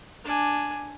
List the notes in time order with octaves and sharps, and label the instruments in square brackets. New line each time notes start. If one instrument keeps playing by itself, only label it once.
[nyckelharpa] D4 G#5